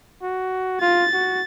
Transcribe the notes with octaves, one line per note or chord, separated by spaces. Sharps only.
F#4
F4 A6
F#4